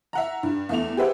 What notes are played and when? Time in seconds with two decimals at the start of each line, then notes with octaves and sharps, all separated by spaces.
0.13 E5 F#5 A#5
0.43 G2
0.69 E2 A3 F7
0.97 G4 G#4 B4 C5 E5 F#5